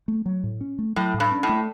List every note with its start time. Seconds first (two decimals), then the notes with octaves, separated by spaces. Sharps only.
0.08 A3
0.26 F#3
0.44 A2
0.61 C#4
0.79 A3
0.96 A2 F#3
1.14 A2
1.20 G2
1.32 C#4
1.43 A2
1.49 A3